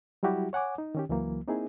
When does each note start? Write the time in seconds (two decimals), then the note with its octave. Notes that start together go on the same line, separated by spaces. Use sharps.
0.23 F#3 G3 E4 F#4 G4
0.53 C#5 F#5 G#5 D6
0.78 D#4
0.95 D#3 C#4 G4
1.09 C#2 E3 F#3 A#3
1.47 A#3 C4 D#4 E4 G#4